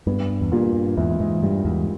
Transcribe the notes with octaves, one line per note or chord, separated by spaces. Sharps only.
G2 B3
E2
G2 A#2
E2 G#2 E4
E2 G#2
G2 G3
E2 G#2